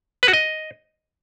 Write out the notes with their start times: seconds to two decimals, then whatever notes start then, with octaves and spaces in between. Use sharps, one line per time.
0.23 B4
0.28 F#4
0.33 D#5